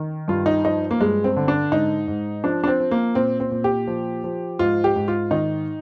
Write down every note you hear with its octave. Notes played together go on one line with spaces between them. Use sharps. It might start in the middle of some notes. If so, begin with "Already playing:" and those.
Already playing: D#3
G2 F4
D#4
F3 D#4
A#3
G2 G#3
C4
D3
D4
G#2 D#4
G#2
F3 D4
D4
C4
F3
A#3
A#2 C4
C4
A#2
G4
F3
F3
G#2 F4
G4
G#2
F4
D#3 D#4